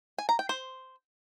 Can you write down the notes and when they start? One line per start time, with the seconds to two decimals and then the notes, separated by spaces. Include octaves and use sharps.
0.18 G#5
0.29 A#5
0.39 G5
0.49 C5